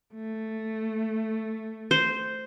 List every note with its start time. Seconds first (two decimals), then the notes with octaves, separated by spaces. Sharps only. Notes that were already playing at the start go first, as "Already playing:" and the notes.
0.14 A3
1.91 C5